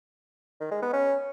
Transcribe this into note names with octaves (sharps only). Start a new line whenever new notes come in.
D#3
G#3
B3
C#4